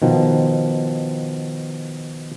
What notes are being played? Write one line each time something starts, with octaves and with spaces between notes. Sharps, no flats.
B2 D#3 F3